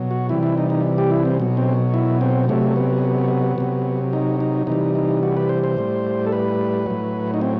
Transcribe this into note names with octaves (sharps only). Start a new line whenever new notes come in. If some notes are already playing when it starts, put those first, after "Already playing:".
Already playing: B2 F#3
F#4
C3 E3 G3 E4
E4
D#4
D#4
G4
E4
C4
B2 F#3
C4
E4
C4
C3 F#3 A3
B3
C3 F#3
D#4
D#4
C3 E3 G3 D#4
D#4
F#4
B4
C5
C5
A2 G3
A4
B4
A2 F#3
D#4
C4